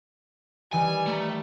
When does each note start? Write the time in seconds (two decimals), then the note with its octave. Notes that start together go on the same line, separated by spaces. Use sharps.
0.73 D#3 E3 G3 G#5
1.07 A3 A5 A#5